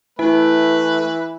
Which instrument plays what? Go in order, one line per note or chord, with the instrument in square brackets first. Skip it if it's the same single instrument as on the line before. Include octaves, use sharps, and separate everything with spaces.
[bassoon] E3 [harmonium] A3 [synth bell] E4 [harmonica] B4